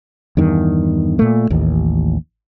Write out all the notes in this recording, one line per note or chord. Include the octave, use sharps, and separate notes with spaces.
E2 G2 D#3
A#2 A3
A1 D#2